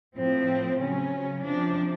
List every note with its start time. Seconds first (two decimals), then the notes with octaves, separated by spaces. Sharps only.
0.17 A2 F3 C4
0.81 C#3 F#3 C#4
1.46 C3 F3 D4